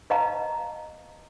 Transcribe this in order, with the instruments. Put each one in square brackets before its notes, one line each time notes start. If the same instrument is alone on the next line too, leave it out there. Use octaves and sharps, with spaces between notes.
[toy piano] B4 D#5 F5 A5 A#5